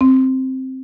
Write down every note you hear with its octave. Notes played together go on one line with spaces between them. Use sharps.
C4